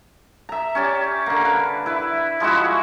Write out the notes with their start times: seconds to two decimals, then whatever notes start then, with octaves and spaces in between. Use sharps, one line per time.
0.49 E5 A#5
0.75 C#4 G4 D5
1.26 D3 A#3
1.45 B4
1.86 E4 B4
2.40 F3 G#3 E4 F#4